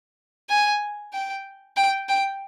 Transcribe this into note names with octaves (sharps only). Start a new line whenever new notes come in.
G#5
G5
G5
G5